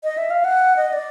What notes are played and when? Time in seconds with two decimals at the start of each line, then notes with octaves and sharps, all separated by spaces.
0.04 D#5
0.18 E5
0.30 F5
0.44 F#5
0.76 D#5
0.93 D5